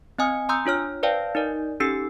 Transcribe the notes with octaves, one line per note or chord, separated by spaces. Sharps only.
C4 D#5 G#5 D#6 F6
G#5 A#5 C6 D#6 E6 G6
D4 F4 C#5 F6
B4 C5 D5 F5 G5 A5
D#4 A#4 D5 D#5
C#4 D#4 G4 A4 E6 C7